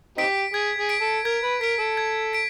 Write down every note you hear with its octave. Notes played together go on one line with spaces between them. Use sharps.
C4 D#4 G4 B6 D7
G#4 G#6
G#4
B6 D7
A4
A#4 G#6
B4
A#4 B6 D7
A4
G#6
B6 D7